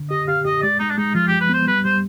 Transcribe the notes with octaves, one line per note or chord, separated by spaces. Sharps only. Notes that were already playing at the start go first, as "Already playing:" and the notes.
Already playing: D3
G4 D#5
G4 F5
G4 D#5
G#3 D5
G#3 D#4
D4
G#3 D#4
F3 F4
G4
F3
B4
B3 C5
G3 B4
G3 C5